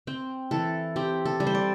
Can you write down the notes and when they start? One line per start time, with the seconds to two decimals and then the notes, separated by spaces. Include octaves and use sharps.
0.07 C4 G5
0.51 E3 A4
0.96 C4 G4
1.25 A4
1.40 G3
1.47 C5
1.55 D5